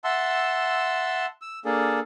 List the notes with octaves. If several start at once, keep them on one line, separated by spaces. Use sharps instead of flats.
E5 F#5 A5 C6 E6
E6
A#3 D4 G#4 A4